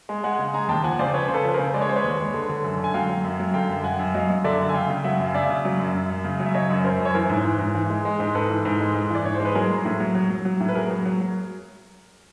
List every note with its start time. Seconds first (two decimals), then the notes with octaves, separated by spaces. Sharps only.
0.09 G#3
0.24 G#3 F#5 G#5
0.39 C#3
0.54 G#3 G#5 A#5
0.68 D#2 G5 A5
0.84 F3 F#5 G#5
0.99 C#3 C5 D5
1.14 F3 B4 C#5
1.28 C#3 C5
1.34 A4 B4
1.44 F3 B4
1.54 C#3 A#4 C5
1.74 G#3 D5
1.81 C#5
1.89 G#3 C5
1.96 B4 C#5
2.04 D#2
2.19 G#3
2.34 D3
2.49 D3
2.64 F#2
2.79 D3
2.84 G#5
2.94 F#3 F5 G5
3.09 F#3
3.24 F#2
3.39 F#3
3.54 D3 F5 G5
3.69 F#2
3.84 F#2 F#5 G#5
3.99 F#2
4.14 F#3 D#5 F5
4.30 F#3
4.44 D3 D5 E5
4.59 F#2
4.69 G#5
4.74 C#3 F5 G5
4.89 C#3
5.04 F#3 E5 F#5
5.20 F#2
5.27 F5
5.35 C#3 D5 E5
5.49 C#3
5.65 F#3
5.79 F#2
5.95 F#2
6.10 F#2
6.24 C#3
6.39 F#3
6.46 E5
6.54 C#3 C#5 D#5
6.70 F#2
6.84 F#2 A#4 C5
7.00 F#2
7.05 C#5
7.15 E3 A#4 C5
7.30 G#2
7.45 E3
7.59 G#2
7.75 E3
7.90 G#3
8.05 G#3
8.20 G#2
8.35 G#2 A4 B4
8.50 E3
8.65 G#2
8.80 G#3
8.95 G#2
9.10 E3 D5
9.25 G#2 C#5
9.35 G#3 C5
9.45 B4
9.55 F#3 G#4 A#4
9.70 F#3
9.85 A2
10.00 F#3
10.15 F#3
10.30 F#3
10.45 F#3
10.60 A2
10.69 B4
10.75 F#3 G#4 A#4
10.90 F#3
11.05 F#3
11.20 F#3